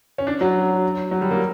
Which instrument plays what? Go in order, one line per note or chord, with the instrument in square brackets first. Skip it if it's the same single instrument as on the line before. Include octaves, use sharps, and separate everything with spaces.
[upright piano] C#4
D4
F#3
F#3
G3
A#3